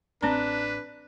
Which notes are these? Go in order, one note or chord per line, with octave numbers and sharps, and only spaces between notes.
A1 C4 D4 B4 A#5